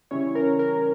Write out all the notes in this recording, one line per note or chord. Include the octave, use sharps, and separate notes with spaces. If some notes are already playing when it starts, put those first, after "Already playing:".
C#3 E3 G3 C#4 E4 C#5
A#4
A#4